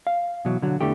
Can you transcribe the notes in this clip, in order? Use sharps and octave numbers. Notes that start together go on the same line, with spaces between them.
F5
B2 E3 F#3
D3 F#3
E2 D3 E3 A3 G4